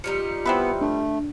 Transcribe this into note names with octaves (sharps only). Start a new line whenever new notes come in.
F3 G3 D#4 C#7
B3 C4 E4 B4
A3 D4